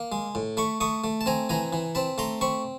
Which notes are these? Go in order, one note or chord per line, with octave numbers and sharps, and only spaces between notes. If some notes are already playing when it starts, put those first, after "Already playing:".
Already playing: A#3
G#3
A2
A3 B5 C#6
A3 C#6 D#6
A3
A5
C4 G#5 A#5
E3 G#5 A#5
E3
C4 A5 B5
A3 A#5 C6
C4 B5 C#6